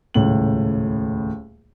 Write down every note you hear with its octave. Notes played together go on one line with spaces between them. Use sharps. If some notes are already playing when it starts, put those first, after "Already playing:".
D#1 C#2 A2 F#7